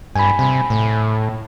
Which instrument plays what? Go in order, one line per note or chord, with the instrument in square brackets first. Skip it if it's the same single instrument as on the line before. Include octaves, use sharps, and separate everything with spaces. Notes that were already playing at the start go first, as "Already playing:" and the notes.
[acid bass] G2 [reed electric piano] G#5 B5
[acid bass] C3
A2